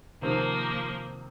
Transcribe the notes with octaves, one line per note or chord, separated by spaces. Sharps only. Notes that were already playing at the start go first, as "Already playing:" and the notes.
C3 D#3 F3 A#3 C4